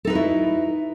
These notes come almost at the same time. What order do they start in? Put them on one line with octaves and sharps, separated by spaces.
A4 D#4 B4 F#4 E4